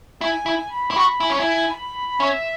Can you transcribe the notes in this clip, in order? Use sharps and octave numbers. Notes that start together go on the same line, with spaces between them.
E4 G#5
E4
B5
E4
F#4
E4 G#5
C#4
E4
B5
C#4 E5